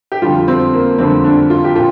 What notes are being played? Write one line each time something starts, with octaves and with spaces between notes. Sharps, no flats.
G4
F2 D3 G3 F4
C4
A#3
F2 D3 G3 C4
D4
F4
G4
A#2 F4